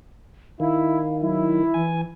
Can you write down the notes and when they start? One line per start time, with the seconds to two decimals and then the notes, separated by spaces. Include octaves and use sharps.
0.60 D#3 E4 F5
1.21 F#3 E4
1.74 E3 G#5